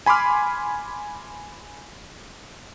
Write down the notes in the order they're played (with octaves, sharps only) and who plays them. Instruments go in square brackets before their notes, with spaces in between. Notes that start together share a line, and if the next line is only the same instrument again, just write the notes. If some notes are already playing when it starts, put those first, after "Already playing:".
[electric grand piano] G#5 B5 C6 D6 F6